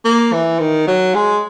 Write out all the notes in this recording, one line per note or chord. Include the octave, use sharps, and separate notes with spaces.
A#3
E3
D#3
F#3
G#3